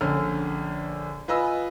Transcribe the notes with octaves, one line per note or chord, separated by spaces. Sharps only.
A#1 D3 C#4 F6
F4 B4 D#5 G#5 E6